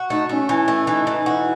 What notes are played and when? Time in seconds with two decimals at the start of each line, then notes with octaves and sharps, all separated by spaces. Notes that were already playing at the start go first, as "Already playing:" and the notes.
Already playing: F#4
0.10 A3 D#4
0.29 A3 C#4
0.49 E3
0.68 A3
0.87 E3 D#4
1.07 E3
1.26 F#4